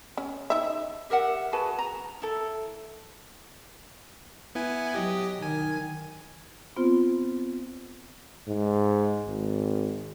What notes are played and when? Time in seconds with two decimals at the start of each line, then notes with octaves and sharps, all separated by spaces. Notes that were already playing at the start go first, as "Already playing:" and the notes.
0.17 C#4
0.50 D#4 E5
1.10 G4 A#4 E5 F#5
1.53 F#4 G#4 B4 A5
1.79 A#5
2.22 E4 A4
4.55 B3 E4 G#5
4.94 F#3 G4 D#5
5.42 D#3 G#5
6.76 B3 C4 F4 C5
8.48 G#2
9.27 G#1